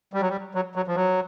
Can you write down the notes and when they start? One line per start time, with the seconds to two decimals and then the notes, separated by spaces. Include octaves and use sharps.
0.13 G3
0.21 F#3
0.29 G3
0.55 F#3
0.75 F#3
0.87 F3
0.96 F#3